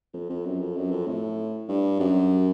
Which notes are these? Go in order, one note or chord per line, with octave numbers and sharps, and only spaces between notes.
F2
F2
F#2
F2
F#2
F2
A2
G2
F#2